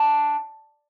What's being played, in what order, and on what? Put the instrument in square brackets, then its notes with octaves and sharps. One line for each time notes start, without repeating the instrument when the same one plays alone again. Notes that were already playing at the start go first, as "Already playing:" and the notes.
Already playing: [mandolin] D4